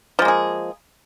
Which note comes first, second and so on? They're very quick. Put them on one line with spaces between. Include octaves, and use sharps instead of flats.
F3 G#3 A#3 G#4